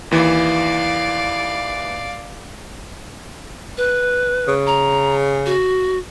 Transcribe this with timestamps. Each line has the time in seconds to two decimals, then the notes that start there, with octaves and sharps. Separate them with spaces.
0.11 D#2 E3 D5 F5
3.78 B4
4.48 C#3
4.67 A#5
5.46 F#4